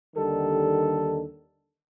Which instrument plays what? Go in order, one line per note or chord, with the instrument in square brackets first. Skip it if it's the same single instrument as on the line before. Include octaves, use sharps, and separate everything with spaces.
[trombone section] D#2 D3 D#3 G3 A4